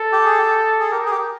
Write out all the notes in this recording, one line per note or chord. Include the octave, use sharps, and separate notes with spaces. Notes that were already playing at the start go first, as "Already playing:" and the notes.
Already playing: A4
G4
G#4
G4
G#4
G4 A#4
G#4
G4